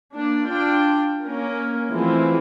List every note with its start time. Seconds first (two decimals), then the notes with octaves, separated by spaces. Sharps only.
0.14 A#3 D4
0.45 D4 F4 G5
1.24 A#3 C#4 A#4
1.92 E3 F3 G#3 A3 C4 E4